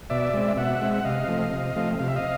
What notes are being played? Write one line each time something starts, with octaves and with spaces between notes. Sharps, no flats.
B2 D5 E5
G#3 C4
B2 E5 F#5
G#3 C4
F#5
C3 D#5 F5
F3 A3 C4
C3
F3 A3 C4
C3 F5
E5
D#5 F5